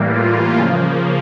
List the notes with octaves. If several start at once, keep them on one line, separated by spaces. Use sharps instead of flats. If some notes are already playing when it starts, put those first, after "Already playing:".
Already playing: A2 E3 G3 A#3
F4
C#3 F3 A#3